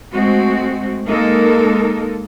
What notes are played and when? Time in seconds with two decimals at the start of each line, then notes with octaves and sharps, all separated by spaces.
0.14 G#3 A3 C4 F#4
1.08 G#3 A#3 D#4 A4 A#4